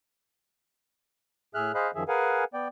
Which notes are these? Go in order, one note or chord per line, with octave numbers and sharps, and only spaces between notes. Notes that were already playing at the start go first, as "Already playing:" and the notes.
A2 G#4 E5 F6 F#6
G#4 C5 D#5 F5 B5 F#6
F#2 D#3 F3 G#4 E5
G#4 A#4 B4 F5 F#5 G#5
B3 D5 G5